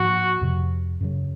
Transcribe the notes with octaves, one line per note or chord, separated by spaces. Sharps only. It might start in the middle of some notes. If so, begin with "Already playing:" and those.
Already playing: G#2 F3 A#3 F#4
F2 C3 F3
F#2 C#3 F#3